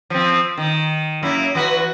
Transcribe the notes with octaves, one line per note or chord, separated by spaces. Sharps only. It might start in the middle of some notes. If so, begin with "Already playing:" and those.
F3 C4
D#3
F#2 A#3 E4
E3 F#4 B4